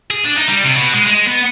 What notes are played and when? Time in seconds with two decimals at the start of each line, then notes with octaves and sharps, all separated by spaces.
0.11 G#4
0.25 D4
0.38 D#4
0.49 G3
0.64 C3
0.77 B2
0.94 G#3
1.08 G#3
1.27 B3